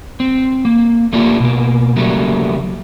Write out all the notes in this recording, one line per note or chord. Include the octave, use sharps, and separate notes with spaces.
C4
A#3
A3 A#3 D4 F4 G4
B2 A#3
C#3 F#3 G3 A3 A#3